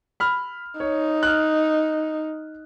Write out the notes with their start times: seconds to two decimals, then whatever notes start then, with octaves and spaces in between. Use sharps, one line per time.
0.20 B5 F6
0.80 D#4 C#5
1.23 F6 F#6